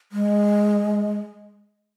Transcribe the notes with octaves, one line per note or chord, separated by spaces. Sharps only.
G#3